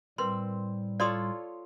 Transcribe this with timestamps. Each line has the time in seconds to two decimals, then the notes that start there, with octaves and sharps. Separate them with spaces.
0.18 A2 G3 C4 A#4 B4 C6
1.00 F4 A4 C#5 D5 C6 D#6